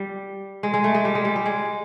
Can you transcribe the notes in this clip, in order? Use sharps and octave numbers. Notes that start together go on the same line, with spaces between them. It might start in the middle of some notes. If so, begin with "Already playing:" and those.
Already playing: G3
G#3
G#3
A3
G#3
G3
G#3
G3
G3
G#3